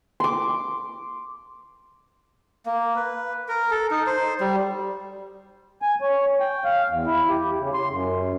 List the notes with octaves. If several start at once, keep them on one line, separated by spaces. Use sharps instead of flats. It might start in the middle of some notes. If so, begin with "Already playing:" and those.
C6 D6
A#3
B4
A#4
A4
D#4
C5
G3
G#5
C#5
G5
F5
E2
E4
G4
C#3
C6
F#2